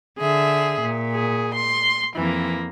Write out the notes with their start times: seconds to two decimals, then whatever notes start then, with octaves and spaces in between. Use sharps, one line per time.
0.18 D3 G#4 E5
0.82 A#2
1.13 G#4
1.54 C6
2.16 F2 E3 A#3